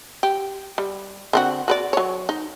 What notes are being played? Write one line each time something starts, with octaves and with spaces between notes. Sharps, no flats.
G4
G3
D3 C4 F#4
F#4 B4 D5
F#3 C#5
D#4